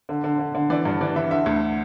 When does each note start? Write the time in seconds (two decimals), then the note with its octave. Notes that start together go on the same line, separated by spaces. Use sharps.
0.09 D3
0.24 D3
0.39 D3
0.55 D3
0.70 E3 D5
0.85 G2 D5
1.01 E3 D5
1.16 E3 E5
1.31 D3 E5
1.46 D2